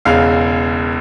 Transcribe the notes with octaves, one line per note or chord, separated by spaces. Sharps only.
E1 E2 C#3 F5